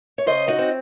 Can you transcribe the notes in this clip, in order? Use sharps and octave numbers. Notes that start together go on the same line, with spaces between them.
C#5
C#3 C5 D#5
D#4 F#4
C4